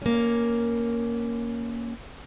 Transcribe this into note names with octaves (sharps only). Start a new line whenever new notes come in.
A#3 C#4